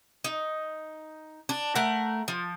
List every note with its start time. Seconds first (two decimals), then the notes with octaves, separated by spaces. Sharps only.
0.24 D#4
1.49 D4
1.75 A3 A#4 F#5
2.28 F3